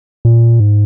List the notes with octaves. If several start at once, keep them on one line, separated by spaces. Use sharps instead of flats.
A#2
G#2